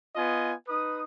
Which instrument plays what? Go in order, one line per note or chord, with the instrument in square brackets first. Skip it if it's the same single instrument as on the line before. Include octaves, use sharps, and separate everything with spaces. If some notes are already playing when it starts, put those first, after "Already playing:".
[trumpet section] B3 F4 D#5 G#5
D#4 B4 D#6